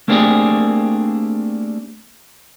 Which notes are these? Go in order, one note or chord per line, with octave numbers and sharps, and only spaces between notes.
A3 A#3 C4 D4 G4 G#4